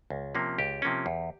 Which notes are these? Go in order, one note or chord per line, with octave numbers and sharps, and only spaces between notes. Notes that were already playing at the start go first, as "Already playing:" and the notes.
C#2
C3 F3 A#3 C#4
C#2 G4
C3 F3 A#3 C#4
E2